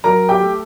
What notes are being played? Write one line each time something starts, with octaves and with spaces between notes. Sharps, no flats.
F#3 A#4 A#5
G4 G5
A3